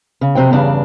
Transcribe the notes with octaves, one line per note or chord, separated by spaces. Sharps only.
C#3
F2 C3 C4 F#4 G5
E2 G2 C#3 D4